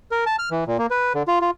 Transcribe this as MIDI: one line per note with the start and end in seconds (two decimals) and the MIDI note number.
0.11 0.25 70
0.26 0.36 81
0.39 0.49 89
0.51 0.64 52
0.67 0.77 46
0.79 0.87 58
0.91 1.13 71
1.15 1.23 50
1.28 1.39 65
1.42 1.51 65